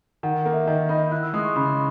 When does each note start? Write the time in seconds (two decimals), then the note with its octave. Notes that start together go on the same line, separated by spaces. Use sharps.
0.23 D#3 F#5
0.39 F#5
0.45 A#3
0.53 E5
0.67 D#3 D#5
0.89 D#4 B5
1.11 E4 F#6
1.23 E6
1.34 G#3 D#6
1.45 C#6
1.56 C#3 B5